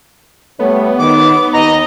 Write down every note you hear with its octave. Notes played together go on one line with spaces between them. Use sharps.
G3 A3 B3 C#5
D#3 D6
D#2 D#3 D#5 A#5